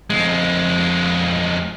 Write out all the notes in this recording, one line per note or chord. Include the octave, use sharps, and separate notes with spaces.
F2 G#3